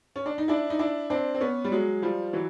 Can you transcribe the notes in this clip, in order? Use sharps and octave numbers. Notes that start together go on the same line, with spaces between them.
C#4
D4
D#4
D4 E4
D#4
D4 E4
C4 D4
C4
B3 C#4
G3
F#3 G#3
F3 G3
E3 F#3